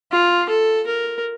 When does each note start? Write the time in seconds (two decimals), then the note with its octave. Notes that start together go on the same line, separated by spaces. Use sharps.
0.12 F4
0.50 A4
0.87 A#4